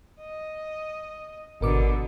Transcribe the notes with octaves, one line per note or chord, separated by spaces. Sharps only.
D#5
G#1 B2 D3 A#4 D6